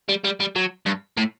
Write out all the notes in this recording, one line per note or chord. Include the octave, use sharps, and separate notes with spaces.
G3
G3
G3
F#3
G2
A2